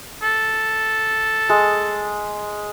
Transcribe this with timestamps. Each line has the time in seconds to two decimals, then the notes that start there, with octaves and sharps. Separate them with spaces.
0.23 A4
1.49 G#3